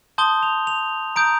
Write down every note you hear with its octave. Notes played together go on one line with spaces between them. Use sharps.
A5 C6 D#6 G6 G7
F7
F7
A#5 D#6 G6 D7